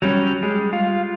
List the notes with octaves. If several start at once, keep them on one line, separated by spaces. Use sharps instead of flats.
F#3 G3 C#4
G3 G#3
F4